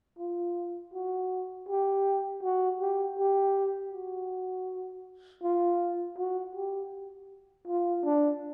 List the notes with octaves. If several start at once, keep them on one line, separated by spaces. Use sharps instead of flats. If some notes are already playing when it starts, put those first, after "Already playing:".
F4
F#4
G4
F#4
G4
G4
F#4
F4
F#4
G4
F4
D4